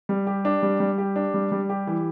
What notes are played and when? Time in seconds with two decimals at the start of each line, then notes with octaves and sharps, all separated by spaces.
0.09 G3
0.27 G4
0.45 D4
0.63 G3
0.80 G3
0.98 G4
1.16 D4
1.34 G3
1.52 G3
1.70 G4
1.87 E3